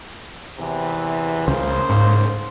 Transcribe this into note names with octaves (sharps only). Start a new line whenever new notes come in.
E2 C3 E3
C#2 C#3 A#3 C5
G#2